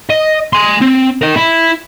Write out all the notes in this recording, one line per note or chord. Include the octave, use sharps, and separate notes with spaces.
D#5
G#5 C6
C4
A#4 D#5
E4